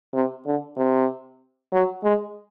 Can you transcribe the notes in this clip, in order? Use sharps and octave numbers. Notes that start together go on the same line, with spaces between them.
C3
D3
C3
F#3
G#3